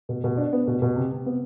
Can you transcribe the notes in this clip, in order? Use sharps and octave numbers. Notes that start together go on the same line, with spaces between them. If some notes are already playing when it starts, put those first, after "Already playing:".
B2
B2
D4
B3
B2
B2
C3
C3
B3